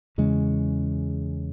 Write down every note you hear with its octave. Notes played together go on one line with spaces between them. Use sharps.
E2 C#3 G#3 C#4